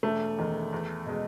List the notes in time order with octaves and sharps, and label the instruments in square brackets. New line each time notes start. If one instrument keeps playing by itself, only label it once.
[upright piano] E1 A3
E2 D#3
E2
B2 G#3